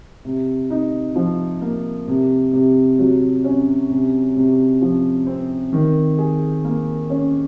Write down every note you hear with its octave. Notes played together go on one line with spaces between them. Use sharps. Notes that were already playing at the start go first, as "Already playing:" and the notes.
C3
D#4
F3
A#3
C3
C3
F#3
C#4
C3
C3
F3
C4
D#3
G#4
A#3
C#4